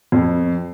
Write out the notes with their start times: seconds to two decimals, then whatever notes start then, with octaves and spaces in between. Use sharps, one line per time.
0.12 F2